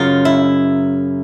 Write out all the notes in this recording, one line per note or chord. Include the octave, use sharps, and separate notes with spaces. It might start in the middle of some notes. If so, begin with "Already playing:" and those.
Already playing: F#2 C#3 F#3 F4
E4